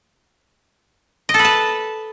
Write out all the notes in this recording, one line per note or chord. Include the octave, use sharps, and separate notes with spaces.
D#5
A4
B4
A5